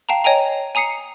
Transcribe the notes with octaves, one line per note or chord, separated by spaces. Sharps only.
F5 G5 A5 A#5
C#5 D#5 G5 G#5 A#5
G#5 A#5 D#6 C7 C#7